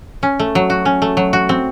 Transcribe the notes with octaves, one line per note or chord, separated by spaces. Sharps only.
C#4
A3
F#3
F#4
C#4
A3
F#3
F#4
C4